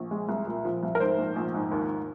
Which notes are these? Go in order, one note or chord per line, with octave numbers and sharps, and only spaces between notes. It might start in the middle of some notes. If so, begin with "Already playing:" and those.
Already playing: A#1
G#3
C2
A#2
F3
C2
A#4
G#2 C5
A#1
A#1
G#2
D#2